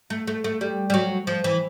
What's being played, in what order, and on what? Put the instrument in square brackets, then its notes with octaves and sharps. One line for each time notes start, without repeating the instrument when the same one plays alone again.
[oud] A3
A3
A3
G3
G3
F#3
F3
E3